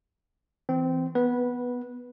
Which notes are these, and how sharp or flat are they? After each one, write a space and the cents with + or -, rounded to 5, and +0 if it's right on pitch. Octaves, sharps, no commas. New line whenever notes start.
E3 +0 C4 -15
B3 +0 B4 -15